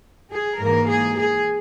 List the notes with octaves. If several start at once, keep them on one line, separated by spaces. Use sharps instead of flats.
G#4
G#2 E3 A#3 A#4
G#4
G#4